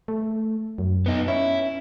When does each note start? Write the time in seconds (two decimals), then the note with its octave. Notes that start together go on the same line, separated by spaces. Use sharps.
0.08 A3
0.78 F#2
1.06 B3 D#4
1.28 C#4 E4